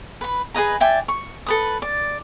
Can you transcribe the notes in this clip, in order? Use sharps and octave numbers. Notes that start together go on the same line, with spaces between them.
B4 B5
G#4 B4 D#5 A#5
D5 E5 G5 G#5
C#6
A4 B4 D#6
D5